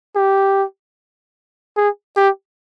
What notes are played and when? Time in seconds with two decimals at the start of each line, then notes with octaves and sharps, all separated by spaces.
0.16 G4
1.77 G#4
2.17 G4